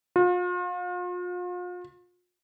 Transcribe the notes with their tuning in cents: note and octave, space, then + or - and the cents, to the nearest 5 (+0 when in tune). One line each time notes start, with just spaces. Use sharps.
F4 +40